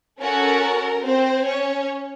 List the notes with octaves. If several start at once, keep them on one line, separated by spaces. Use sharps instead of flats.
C#4 F#4 A4 A#4
C4 C5
C#4 C#5